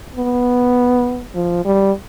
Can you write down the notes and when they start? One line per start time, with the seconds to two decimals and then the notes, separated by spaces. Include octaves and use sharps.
0.16 B3
1.35 F3
1.65 G3